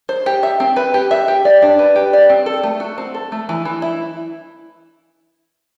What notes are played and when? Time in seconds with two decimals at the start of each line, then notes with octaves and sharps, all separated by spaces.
0.09 C5
0.26 G4
0.43 E5
0.60 C4
0.76 B4
0.94 G4
1.11 E5
1.28 G4
1.45 D5
1.62 D4
1.79 B4
1.96 G4
2.13 D5
2.29 C4
2.46 A4
2.63 A3
2.80 F#4
2.98 C4
3.14 A4
3.32 A3
3.49 E3
3.65 E3
3.82 E4